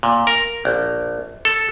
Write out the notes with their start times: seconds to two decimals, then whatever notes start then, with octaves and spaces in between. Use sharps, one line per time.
0.03 A#2
0.27 A#4
0.65 A#1
1.45 A4